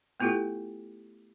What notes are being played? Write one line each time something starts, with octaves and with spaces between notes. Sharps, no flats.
A3 B3 E4 F4 G4 A4